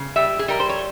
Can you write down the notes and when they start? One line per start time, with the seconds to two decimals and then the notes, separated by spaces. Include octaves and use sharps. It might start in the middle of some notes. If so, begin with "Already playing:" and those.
Already playing: C#3
0.16 G3 E5
0.39 G#4
0.48 G3 A#4
0.59 C5
0.69 C#5